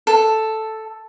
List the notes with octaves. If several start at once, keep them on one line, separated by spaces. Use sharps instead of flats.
A4